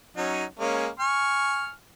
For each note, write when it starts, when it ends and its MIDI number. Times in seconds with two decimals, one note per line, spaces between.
0.17 0.44 54
0.17 0.44 61
0.17 0.44 63
0.59 0.88 56
0.59 0.88 58
0.59 0.88 61
0.99 1.71 80
0.99 1.71 85
0.99 1.71 89